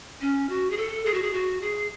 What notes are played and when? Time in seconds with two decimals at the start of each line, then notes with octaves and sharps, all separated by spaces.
0.21 C#4
0.49 F#4
0.70 G#4
0.77 A4
1.05 G#4
1.14 F#4
1.22 G#4
1.33 F#4
1.62 G#4